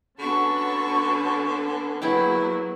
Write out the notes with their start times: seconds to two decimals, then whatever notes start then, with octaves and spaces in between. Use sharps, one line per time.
0.19 D3 B3 C#4 F#4 A5 C#6
2.02 F#3 A#3 B3 E4 G#4 G5